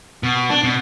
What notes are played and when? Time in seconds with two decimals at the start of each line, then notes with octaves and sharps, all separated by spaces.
0.23 B2
0.50 D4
0.63 B2